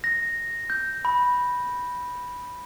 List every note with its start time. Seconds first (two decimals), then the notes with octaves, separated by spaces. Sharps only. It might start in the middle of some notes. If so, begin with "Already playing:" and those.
0.04 A#6
0.70 G6
1.05 B5